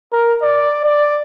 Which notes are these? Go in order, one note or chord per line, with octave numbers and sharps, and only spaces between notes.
A#4
D5
D5